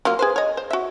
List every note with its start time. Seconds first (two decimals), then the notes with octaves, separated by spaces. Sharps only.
0.05 F#3 A#3 F4
0.19 G#4 B4 C5
0.36 C#5 D#5
0.57 C5
0.71 F#4 E5